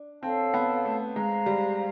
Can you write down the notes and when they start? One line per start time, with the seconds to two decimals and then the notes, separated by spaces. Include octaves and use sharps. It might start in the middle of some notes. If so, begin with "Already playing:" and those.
Already playing: D4
0.23 C4 A4 C#5 F5 A5
0.54 B3
0.85 A3
1.16 G#3 C5 F5 A#5
1.46 G3